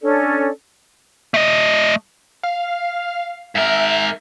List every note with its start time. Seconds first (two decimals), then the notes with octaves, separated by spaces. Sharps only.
0.01 C#4 D4 A4 D5
1.34 A3 D#5
2.43 F5
3.55 G#2 A#4 E5